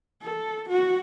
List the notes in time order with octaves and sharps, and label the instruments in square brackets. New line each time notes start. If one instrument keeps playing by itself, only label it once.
[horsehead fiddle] A4
F#4